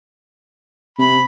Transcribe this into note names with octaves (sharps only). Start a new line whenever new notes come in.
C3 B5